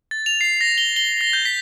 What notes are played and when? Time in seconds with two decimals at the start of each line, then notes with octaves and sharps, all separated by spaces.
0.11 A6
0.26 F7
0.41 C7
0.61 A#6
0.78 G7
0.96 G7
1.21 A#6
1.33 G6
1.45 B6